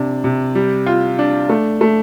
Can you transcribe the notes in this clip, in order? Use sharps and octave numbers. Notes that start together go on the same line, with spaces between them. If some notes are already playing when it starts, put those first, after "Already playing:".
Already playing: C3 D4
C3
G3
F4
D4
A3
A3